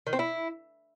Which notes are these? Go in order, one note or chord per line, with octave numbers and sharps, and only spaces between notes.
D#3
C4
E4